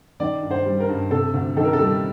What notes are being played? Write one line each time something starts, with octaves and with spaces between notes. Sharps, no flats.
D#3 D5
G2
C5
G3
A#4
G2
C3 A4
D2
D#3 A4
A#4
A4
G3